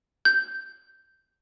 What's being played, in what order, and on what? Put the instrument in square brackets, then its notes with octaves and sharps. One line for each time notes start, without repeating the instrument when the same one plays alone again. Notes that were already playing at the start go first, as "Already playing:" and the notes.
[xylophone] G6